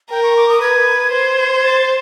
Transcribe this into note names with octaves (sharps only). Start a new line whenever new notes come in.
A#4 G5
C#6
D6
D#6
B4 G#6
C5
A6